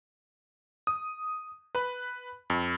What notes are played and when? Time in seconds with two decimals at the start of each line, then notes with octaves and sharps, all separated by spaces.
0.87 D#6
1.75 B4 B5
2.50 F2